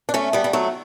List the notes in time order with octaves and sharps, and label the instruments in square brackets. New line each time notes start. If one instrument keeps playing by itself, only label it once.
[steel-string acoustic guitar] D4
A3 C#4
G3 B3
G3
F#3 A3